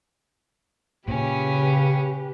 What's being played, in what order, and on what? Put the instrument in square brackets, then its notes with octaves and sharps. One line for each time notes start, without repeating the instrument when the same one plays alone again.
[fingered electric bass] A#2 [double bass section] C#3 [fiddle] C#4 [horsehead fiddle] G4 B4